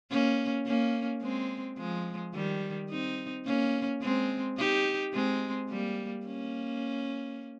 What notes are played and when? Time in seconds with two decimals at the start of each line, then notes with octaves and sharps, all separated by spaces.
0.11 A#3 C#4
0.66 A#3 C#4
1.22 G#3 C4
1.78 F3 G#3
2.34 D#3 G3
2.90 C4 D#4
3.46 A#3 C#4
4.02 G#3 C4
4.58 D#4 G4
5.13 G#3 C4
5.70 G3 A#3
6.26 A#3 C#4